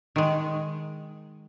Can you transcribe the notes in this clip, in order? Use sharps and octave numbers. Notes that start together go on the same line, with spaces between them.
D#3 G#3